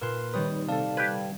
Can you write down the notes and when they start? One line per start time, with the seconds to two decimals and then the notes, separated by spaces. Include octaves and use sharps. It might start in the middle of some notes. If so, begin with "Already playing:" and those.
0.01 A#2 A#4 B4 C6
0.34 D#3 G3 C4 B4 C#5 D#6
0.69 C3 A4 D5 F5 A5
0.97 G4 B4 G#6